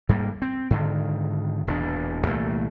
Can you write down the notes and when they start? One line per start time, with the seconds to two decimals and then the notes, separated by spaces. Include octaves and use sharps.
0.09 G#2 G3 A3 A#3
0.42 C4
0.70 G#2 D3 D#3
1.67 E1 E2 A#2 D4
2.26 C2 A#2 E3 A3